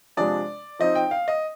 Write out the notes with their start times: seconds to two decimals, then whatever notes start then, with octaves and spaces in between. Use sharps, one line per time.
0.17 C3 F3 G#3 D4 D5
0.79 F3 C4 D#4 D#5
0.95 G5
1.11 F5
1.28 D#5